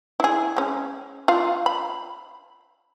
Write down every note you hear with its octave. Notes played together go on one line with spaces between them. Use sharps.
E4 G#4
G#3 C#4
F4 F5
B5